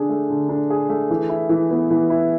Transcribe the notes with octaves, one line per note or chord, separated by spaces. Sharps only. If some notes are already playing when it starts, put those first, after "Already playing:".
Already playing: D3 D4 G#4
A3
D3
D4
G#4
A3
E3
E4
E3
B3
E3
E4